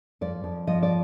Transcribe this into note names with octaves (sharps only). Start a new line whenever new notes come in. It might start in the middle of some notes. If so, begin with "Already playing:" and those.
F2 D5
F2
F3 D#5
D5